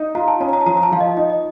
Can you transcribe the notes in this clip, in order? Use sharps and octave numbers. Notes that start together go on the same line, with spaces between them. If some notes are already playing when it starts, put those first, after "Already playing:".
Already playing: D#4
F4 A#5
A5
C#4 A#5
A#5
A5
F3 A#5
A#5
A5
F3 F5
D#5
D#4 D#5
D#5